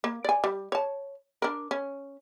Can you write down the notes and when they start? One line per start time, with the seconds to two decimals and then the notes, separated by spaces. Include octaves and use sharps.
0.04 A#3
0.25 D5 G#5
0.44 G3
0.72 C#5 A5
1.42 D4 A#4
1.71 C#4